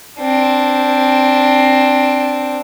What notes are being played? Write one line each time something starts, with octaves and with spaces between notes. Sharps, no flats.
C4 D4